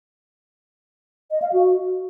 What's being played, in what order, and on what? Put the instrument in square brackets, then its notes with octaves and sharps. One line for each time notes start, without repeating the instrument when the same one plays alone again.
[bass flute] D#5
F5
F#4